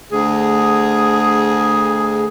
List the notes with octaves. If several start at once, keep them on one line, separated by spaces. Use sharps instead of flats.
D2 G#4